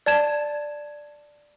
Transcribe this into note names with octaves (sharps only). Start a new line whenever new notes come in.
D5 A5 G#6 E7